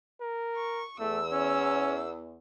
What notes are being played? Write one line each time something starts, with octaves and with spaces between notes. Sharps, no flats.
A#4
C#6
E2 A3 E6
C#4